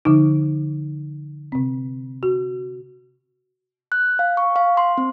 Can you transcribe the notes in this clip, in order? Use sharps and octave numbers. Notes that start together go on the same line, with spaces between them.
D3 F3 D#4
C3 C4
F#4
F#6
F5
C#6
F5
C6
C4